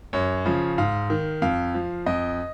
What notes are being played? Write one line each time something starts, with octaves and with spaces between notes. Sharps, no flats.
F#2 C#5
C#3 F3
G#2 F5
D#3
F2 F5
F3
F2 D#5